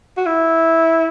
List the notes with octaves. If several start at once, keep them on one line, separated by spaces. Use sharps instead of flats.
F#4
E4